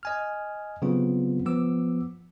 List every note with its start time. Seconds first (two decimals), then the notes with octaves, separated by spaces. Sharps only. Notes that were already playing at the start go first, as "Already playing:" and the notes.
0.03 D#5 G#5 F6
0.82 C#3 F#3 G3 B3 C4 F4
1.46 F3 B3 D6 E6